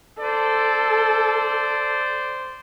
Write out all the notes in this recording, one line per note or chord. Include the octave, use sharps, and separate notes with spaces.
A4 C5 D5